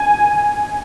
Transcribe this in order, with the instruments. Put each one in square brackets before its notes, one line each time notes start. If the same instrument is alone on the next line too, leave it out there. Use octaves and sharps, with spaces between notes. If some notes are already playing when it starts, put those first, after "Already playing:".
Already playing: [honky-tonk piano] G#5